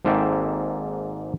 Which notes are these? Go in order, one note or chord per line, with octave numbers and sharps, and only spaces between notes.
G#1 G#2 A#3 A4 E5 G5